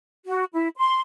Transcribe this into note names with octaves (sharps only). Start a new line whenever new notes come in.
F#4
E4
C6